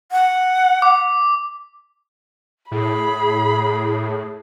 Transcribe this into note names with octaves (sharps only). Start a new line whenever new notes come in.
F#5
D6
A2 G#4 B5